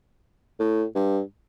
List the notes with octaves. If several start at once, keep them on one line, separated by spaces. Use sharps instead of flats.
A2
G2